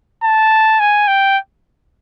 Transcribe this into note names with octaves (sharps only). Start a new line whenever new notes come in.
A5
G#5
G5